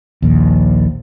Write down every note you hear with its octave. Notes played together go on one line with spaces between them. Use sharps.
A#1 D#2